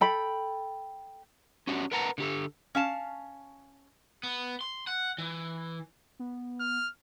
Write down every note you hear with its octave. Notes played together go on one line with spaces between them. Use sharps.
A4 G5 B5
C#4 D4 F#4 G4
A#4 B4 F#5 A5 A#5
D3 G4 A4
C#4 F5 A5
B3
C6
F#5
E3
B3
F6